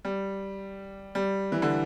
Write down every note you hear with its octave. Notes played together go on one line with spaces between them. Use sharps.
G3
G3
E3
D3